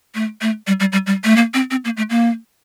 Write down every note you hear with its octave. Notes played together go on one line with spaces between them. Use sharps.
A3
A3
G3
G3
G3
G3
A3
A#3
C4
C4
A#3
A3
A#3